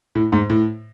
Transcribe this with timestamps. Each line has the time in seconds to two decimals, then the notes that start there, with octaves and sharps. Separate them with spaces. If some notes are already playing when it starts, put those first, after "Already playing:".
0.15 A2
0.32 G#2
0.50 A2